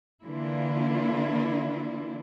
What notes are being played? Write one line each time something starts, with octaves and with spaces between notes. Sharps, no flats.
D3 E3 A#3 D4 E4 F4